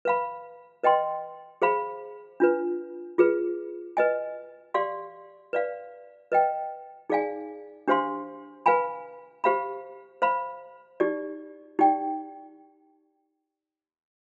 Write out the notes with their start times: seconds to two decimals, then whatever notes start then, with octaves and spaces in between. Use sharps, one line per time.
0.05 B4 F5 B5
0.83 B4 D#5 G5 C6
1.62 G#4 C5 F5 B5
2.40 D4 F4 B4
3.18 F4 G#4 B4
3.97 B4 D#5 G#5
4.74 G4 D5 F5 C6
5.53 B4 D5 F5
6.32 B4 D#5 G5
7.10 D#4 G#4 D5 F5 G#5
7.88 D4 G4 C5 F5 C6
8.66 B4 F5 G#5 B5
9.44 G4 C5 F5 B5
10.22 C5 F5 B5
11.00 D#4 G4 D5
11.79 D#4 G4 D5 G5